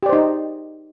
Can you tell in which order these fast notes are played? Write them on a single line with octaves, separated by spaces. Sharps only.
G4 D5 C5 D#4